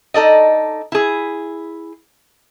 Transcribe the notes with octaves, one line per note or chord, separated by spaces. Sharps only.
D#4 A4 D5 D#5
E4 G#4